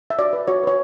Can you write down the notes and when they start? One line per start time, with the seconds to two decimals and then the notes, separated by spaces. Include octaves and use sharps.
0.10 E5
0.18 F#4 D5
0.33 B4
0.48 F#4 C#5
0.63 B4 C#5